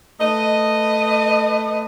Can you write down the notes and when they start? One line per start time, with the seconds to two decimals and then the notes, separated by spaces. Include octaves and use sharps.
0.21 A3 B4 D#5